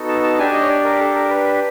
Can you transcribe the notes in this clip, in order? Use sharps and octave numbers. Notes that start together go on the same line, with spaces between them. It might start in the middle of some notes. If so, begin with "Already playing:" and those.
Already playing: B3 D#4 F#4 A4
A5
A5
D4 G4 G#5
D#5
C#5
D5
A#4
A4
A#4
B4